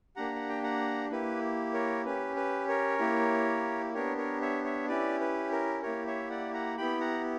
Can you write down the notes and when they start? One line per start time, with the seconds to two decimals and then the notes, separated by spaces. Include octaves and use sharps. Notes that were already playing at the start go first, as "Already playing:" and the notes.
0.16 A#3 D4 G4 F#5 A#5
0.36 F#5
0.49 G5
0.63 F#5 A#5
1.10 A#3 E4 G4 B4
1.73 A#4 C#5
2.05 C#4 G4 B4
2.36 B4
2.68 A#4 C#5
2.99 A#3 E4 G4
3.94 B3 D4 G4 A#4 C#5
4.17 A#4 C#5
4.42 C#5 E5
4.64 C#5 E5
4.88 C#4 E4 G4 B4 D5
5.21 B4
5.52 A#4
5.82 A#3 E4 G4 A#4 C#5
6.07 C#5 E5
6.30 D5 F#5
6.54 F#5 A#5
6.77 B3 E4 G4 G5 B5
7.01 F#5 A#5